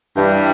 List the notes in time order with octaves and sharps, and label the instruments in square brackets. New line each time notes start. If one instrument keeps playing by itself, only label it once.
[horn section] G2 E3 G3